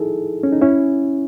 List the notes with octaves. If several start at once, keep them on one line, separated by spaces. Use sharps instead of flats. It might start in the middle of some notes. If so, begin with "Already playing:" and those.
Already playing: D#4 E4 G#4 A4
C#4
D#4
C#4 E4